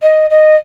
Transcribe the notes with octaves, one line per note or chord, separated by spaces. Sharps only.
D#5
D#5